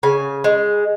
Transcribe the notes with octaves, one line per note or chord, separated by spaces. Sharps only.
C#3 G#5
G#3